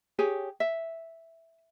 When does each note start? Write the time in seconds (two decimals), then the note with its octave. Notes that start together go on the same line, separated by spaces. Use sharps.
0.19 G4 G#4 C#5 G#5
0.60 E5